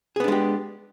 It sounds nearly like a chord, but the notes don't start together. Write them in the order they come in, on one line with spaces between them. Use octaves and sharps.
G#4 B3 D4 G#3 G4